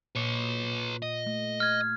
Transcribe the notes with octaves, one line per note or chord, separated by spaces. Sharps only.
A#2 B4 C#5
D#5
A3
F6 G#6